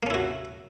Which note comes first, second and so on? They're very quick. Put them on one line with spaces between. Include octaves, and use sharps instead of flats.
A#3 C#4 E4 F#4